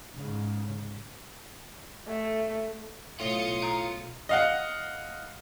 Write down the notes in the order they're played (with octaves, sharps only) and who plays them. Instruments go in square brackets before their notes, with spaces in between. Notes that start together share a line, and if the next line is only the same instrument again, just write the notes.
[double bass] G#2 C#3
[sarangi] A3
[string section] B1 D#6 C#7 [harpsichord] A2 [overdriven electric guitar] F4
[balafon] F5 A#5
[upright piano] D#5 F5 F#5